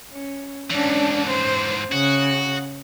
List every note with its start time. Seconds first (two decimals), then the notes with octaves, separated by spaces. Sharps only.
0.11 C#4
0.70 G#2 E3 C#4 D4
1.29 C5
1.92 C#3 F#4